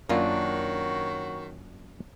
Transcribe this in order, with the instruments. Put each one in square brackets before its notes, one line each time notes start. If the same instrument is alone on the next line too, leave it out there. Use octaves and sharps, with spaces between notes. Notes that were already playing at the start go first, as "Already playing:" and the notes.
[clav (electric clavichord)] F#2 A#3 F4 [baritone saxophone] D#3 [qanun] D4 [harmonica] F#4 C#5